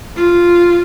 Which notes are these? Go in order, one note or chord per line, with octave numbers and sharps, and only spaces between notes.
F4